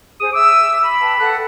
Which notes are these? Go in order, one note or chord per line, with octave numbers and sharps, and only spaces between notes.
G#4 C5 D#6
E5 D6 E6
B5
B4 G5 A5
A4 F#5 F#6